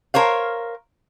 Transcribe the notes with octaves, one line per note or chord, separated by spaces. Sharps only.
A#4 C5 C#5 F5